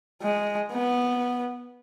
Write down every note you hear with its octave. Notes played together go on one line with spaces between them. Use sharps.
G#3
B3